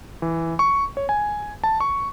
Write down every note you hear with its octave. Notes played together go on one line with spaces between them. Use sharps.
E3
C#6
C#5
G#5
A5
C#6